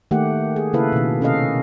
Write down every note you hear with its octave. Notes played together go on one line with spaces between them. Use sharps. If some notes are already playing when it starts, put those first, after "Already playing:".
D#3 A3 A#3 G4 F#5
G#4
C#3 A#3 E4 A4 B4 F5
B2 D#3
C3 C#4 A4 A#4 D#5 F5